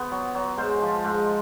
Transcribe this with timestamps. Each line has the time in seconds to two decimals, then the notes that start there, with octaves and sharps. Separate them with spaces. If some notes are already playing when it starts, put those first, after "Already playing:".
Already playing: B3 C5
0.11 F#3
0.35 F#3
0.57 G#2 C5
0.82 F3
1.05 G#2